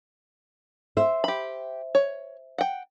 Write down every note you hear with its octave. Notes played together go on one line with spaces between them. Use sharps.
C5 E5
G4 B5
C#5
F#5 G5